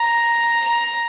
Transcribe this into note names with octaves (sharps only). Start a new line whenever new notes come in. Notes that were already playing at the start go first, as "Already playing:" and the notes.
Already playing: A#5
A#5